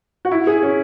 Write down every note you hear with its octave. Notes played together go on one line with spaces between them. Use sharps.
F#4
E4
G#4
C#4